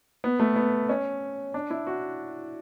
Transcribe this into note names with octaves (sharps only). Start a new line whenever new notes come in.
B3
A3
B3
C#4
D4
E4
F#4